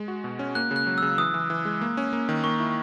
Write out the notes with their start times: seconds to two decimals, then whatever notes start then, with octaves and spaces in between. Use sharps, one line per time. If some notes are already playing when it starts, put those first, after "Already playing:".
Already playing: G#3
0.08 F#4
0.24 B2
0.39 C#4
0.55 A#3 F#6
0.71 C#3
0.76 F#6
0.87 F#3
0.98 E6
1.02 C#3
1.18 E3 D#6
1.34 E3
1.50 E3
1.65 G#3
1.81 A#3
1.97 C#4
2.13 A#3
2.29 D#3
2.44 A#3 C#6
2.60 E4